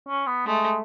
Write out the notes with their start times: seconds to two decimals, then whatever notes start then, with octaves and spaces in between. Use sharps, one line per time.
0.08 C#4
0.27 B3
0.46 G#3 A3